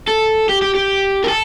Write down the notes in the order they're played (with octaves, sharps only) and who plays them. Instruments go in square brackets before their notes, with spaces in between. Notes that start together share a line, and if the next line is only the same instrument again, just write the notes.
[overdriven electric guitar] A4
G4
G4
G4
A#4
A4